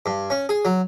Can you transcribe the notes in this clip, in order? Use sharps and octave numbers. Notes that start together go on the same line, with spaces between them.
G2
C#4
G#4
F#3